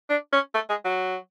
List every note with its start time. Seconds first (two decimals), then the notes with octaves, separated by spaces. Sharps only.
0.09 D4
0.32 C#4
0.54 A3
0.69 G#3
0.84 F#3